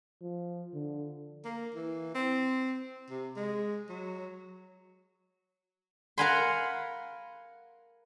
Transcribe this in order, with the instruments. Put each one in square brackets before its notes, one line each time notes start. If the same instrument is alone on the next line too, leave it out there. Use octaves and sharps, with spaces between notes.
[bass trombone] F3
D3
[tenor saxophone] A#3
E3
C4
C3
G#3
F#3
[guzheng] A#4 F5 F#5 G#5 B5 C6